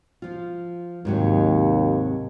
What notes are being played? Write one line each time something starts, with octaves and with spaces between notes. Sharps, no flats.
F3 F4
D#2 G#2 C3 F#3